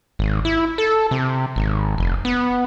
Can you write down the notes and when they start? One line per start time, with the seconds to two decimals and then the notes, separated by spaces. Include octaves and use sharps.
0.19 G#1
0.45 E4
0.78 A4
1.11 C3
1.56 G#1
1.98 F1
2.25 B3